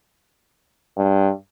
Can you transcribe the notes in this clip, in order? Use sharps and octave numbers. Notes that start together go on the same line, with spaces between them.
G2